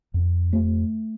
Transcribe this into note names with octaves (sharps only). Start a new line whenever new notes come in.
F2
A3